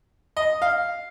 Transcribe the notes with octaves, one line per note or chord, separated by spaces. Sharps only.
D#5
F5